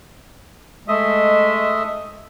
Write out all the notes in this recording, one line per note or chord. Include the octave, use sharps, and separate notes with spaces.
G#3 A3 D#5 E5